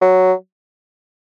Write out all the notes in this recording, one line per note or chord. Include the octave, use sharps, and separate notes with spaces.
F#3